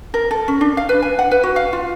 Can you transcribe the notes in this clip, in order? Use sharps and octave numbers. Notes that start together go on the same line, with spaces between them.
A#4
A4
C#4
D4
F5
B4
G#5
F#5
B4
F#4
F5
F4